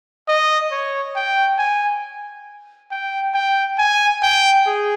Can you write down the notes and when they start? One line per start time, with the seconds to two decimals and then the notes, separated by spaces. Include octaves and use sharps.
0.28 D#5
0.71 C#5
1.16 G5
1.59 G#5
2.91 G5
3.34 G5
3.78 G#5
4.22 G5
4.66 G#4